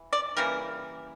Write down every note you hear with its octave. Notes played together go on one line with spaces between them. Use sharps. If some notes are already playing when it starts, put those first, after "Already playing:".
Already playing: E3
D5
C#3 E3 G3 A#3 A#4